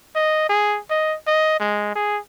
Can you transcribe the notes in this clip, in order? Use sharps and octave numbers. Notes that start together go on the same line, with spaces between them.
D#5
G#4
D#5
D#5
G#3
G#4